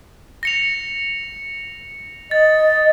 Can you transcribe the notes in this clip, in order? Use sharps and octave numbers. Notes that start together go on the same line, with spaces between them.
A#6 C#7 F7
D#5 A6